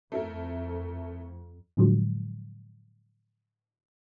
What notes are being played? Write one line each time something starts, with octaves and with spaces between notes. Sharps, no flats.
F2 A3 E4 A#4
A2 D3 F3 F#3 G#3